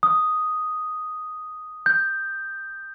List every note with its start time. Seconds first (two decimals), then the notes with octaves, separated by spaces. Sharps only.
0.03 D#6
1.86 G6